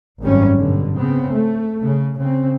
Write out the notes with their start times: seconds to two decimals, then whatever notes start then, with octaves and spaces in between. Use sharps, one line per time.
0.21 G#1 F#2 G3 C#4
0.56 G2 B2 D3
0.98 C#3 B3 C4
1.32 A3
1.83 C#3
2.18 C#3 C4